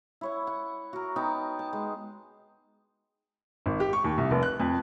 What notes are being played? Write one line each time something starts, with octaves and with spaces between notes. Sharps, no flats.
E4 C#5 F#5
F#5
F#4 A#4
B3 D#4 G5 A5
A5
G#3
G#1
G4
C#6
D#2
C2
F1
F#6
F2